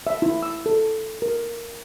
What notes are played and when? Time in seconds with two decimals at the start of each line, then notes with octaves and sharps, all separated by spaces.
0.07 E5
0.22 E4
0.43 E6
0.66 A4
1.22 A#4